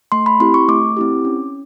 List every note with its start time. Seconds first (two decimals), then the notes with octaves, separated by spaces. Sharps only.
0.12 A3 C6
0.26 B5
0.40 C4 E4 G4 C6
0.54 C#6
0.68 A3 D6
0.97 C4 E4 G4
1.25 C#4